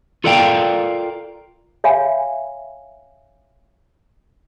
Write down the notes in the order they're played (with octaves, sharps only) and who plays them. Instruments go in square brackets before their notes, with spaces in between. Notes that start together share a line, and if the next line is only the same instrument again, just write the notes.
[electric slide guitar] F4 A4 A#4 D5 F5 G5
[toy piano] C#5 E5 F5 G#5 B5